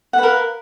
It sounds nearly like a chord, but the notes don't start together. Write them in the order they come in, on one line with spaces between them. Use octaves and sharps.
F#5 B4 A#4 F5